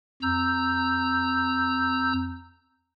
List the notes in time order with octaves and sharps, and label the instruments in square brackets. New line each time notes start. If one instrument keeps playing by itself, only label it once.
[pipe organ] F2 A#5 E6 G6